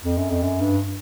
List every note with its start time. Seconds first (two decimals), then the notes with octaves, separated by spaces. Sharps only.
0.04 F2
0.17 F#2
0.30 F2
0.43 F#2
0.61 G2